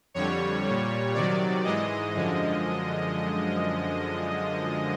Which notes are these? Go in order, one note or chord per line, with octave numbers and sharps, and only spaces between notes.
F2 D3 G3 C#5
A#2 G3
C3 D#3 F#3 D5
G#2 E3 G#3 D#5
F#2 D3 F3 G#3